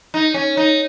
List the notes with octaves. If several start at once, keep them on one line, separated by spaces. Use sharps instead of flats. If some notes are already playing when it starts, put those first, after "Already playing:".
D#4
C#4
D#4